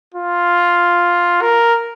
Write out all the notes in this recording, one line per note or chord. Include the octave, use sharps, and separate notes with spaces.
F4
A#4